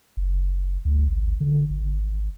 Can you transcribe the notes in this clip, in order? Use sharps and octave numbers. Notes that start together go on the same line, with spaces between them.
F#1
D2
G#1
D3
G#1